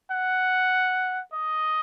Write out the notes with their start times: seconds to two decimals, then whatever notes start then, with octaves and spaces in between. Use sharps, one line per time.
0.11 F#5
1.33 D#5